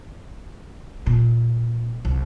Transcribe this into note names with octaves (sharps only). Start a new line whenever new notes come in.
A#2
C2